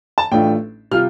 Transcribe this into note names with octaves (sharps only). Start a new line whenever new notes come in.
A5
A1 A2 A3 D4 F4 G5
C3 G3 F4 F6